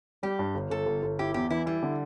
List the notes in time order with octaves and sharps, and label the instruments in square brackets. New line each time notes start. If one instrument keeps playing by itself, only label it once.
[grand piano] G3 [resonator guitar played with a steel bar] G4
[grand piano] G2
G1
[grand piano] G1 [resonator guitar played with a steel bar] A4
[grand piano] G1
G1
[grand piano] E4 [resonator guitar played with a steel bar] G4
[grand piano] E2 [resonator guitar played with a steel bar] G4
[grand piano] E3 [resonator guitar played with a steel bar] E4
[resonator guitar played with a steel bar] G3 [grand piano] E4
[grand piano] D3